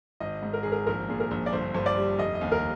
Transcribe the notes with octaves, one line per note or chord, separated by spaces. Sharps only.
G#1 D#5
G#2
A#4
G#1 G#4
A#4
A#1 A#4
A#2 G#4
A#4
A#1
D5
G1 C5
G2 C5
D5
G3
F1 D#5
D#5
D#2
A#4